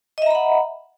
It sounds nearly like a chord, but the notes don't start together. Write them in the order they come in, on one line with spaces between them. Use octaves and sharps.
D#5 E5 A#5 B5 F#5